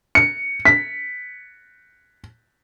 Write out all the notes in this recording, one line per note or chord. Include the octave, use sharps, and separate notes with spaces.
C#7
B6